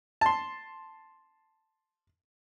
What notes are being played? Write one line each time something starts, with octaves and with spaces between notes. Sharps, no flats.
A5 C6